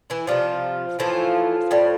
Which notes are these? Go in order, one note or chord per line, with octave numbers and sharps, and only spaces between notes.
E3 E4
C3 F3 G3 F4
A2 E3 F3 A3 F4
A2 G3